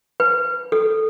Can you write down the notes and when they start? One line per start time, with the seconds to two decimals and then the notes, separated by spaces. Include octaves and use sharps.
0.20 B4
0.72 A4